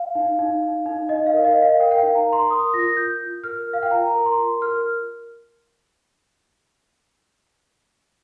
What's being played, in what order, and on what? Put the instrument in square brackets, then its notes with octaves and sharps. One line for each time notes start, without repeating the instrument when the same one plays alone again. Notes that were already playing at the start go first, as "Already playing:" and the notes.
Already playing: [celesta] F5
D#4
D#4
D#4
D#4
D#4 D#5
F5
A#4
F5
D#5
A#4
F5
A#4 G5
G5
F5
D#4
A#5
A#4
C6
A#4 D#6
F4 A#6
A#6
F4 G6
F4
A#4 F6
A#4
F5
G5
F4 A#5
A#4
C6
F4
A#4 F6